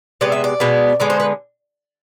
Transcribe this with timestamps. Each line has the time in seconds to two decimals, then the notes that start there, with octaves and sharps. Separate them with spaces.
0.21 C3 G#3 B3 D5
0.32 E5
0.44 D5
0.60 B2 G#3 B3
1.00 D3 G#3 B3 D5
1.10 C5
1.20 B4